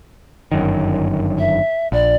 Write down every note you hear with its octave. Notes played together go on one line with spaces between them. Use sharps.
G1 F#2 D#3
E5
A#1 D5